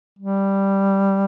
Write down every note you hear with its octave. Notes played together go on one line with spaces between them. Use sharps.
G3